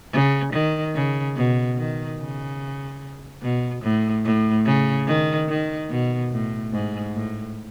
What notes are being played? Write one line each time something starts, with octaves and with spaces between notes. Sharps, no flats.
C#3
D#3
C#3
B2
D#3
C#3
B2
A2
A2
C#3
D#3
D#3
B2
A2
G#2
A2